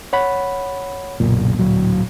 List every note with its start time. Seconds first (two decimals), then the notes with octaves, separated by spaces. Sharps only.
0.13 C#5 F#5 B5
1.20 F#1 B1 A#2
1.59 D1 F#3